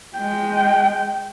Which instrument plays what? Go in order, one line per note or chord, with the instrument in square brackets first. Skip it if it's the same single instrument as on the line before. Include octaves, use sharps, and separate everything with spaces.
[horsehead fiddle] G#3 G5